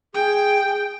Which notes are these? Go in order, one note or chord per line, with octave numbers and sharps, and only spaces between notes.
G#4 G5